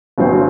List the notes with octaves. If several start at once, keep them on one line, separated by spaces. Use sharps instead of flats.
G1 G2 F#3 C4